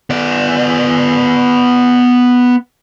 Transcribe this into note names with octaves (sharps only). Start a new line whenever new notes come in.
B3 D5